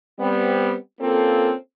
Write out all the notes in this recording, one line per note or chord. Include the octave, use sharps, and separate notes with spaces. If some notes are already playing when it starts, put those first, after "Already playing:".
G3 B3 C4
A#3 C4 C#4 F4 A4